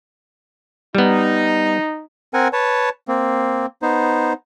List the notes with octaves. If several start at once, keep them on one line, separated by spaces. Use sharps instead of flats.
G3 B3 D#4
C4 A#4 F#5 G#5
B4 C#5 A5
A#3 C4
B3 D#4 C5